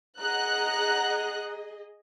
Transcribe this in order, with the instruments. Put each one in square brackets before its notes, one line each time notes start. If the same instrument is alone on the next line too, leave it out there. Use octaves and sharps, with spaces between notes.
[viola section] G#4 D#5 [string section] F#5 A#5 F#6